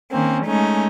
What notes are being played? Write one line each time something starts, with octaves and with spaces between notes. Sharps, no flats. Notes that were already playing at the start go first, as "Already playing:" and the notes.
D#3 A#3 C4 C#4
G#3 A3 C#4 D#4